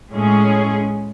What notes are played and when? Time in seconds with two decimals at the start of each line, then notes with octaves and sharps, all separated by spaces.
0.15 A2 G#3 C#4 G#4